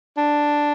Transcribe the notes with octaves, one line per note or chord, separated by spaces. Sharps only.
D4